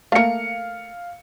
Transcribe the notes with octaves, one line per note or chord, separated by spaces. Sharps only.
A3 A#3 F5 C#7